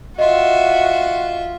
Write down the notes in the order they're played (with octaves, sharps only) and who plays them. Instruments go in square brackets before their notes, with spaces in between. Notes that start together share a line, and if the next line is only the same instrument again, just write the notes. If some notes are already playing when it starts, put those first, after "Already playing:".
[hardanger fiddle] F4 E5 [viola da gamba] F#4 [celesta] D#5